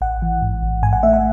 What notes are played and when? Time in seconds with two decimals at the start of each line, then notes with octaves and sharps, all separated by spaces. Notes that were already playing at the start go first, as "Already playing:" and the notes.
0.01 A1 F#5
0.22 E3
0.42 G#2
0.62 A1
0.83 G#2 G#5
0.93 F#5
1.03 A3 E5
1.13 F#5